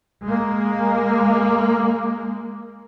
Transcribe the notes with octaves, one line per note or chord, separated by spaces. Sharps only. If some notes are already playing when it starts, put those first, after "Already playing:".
G#3 A#3